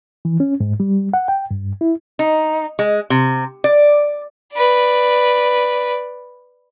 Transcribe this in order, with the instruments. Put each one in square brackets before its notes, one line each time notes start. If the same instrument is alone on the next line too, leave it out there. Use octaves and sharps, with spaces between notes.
[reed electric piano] E3
C#4
G#2
G3
F#5
G5
G2
E4
[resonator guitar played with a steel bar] D#4
G#3
C3
D5
[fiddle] B4 D5